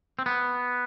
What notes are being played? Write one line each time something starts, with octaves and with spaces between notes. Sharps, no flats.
C4
B3